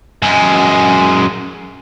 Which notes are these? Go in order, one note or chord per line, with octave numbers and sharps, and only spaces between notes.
F#2 G#3